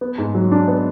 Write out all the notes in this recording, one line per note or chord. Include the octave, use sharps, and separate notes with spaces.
B3
G#2
F#3
D4
B3